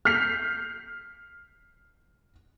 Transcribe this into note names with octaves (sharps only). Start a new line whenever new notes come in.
F6 G6 B6 C7 F7